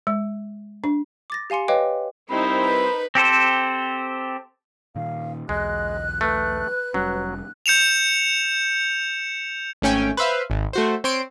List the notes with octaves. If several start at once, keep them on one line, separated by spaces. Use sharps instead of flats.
G#3
D4
D6 A6 A#6
G4 F5 G#5 C6 C#7
B4 C#5 D#5 F5 G5 D6
G3 C4 D#4 E4 A#4 C5 B5
B4
C4 G4 A4 C5
A#2 D#3 F5
B1 E2 G#3 D#5 F#6
A3 B4
F1 F#3 G3 C#4
G6 C#7 E7 F7
G#1 A3 C#4 G5 G#5
B4 C5 E5 F5
G#1
A3 F#4 C5
C4 C#5 C6 D7